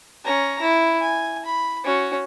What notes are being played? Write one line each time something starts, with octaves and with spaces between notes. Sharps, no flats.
C#4 A#5
E4
G#5
B5
C#4 F#4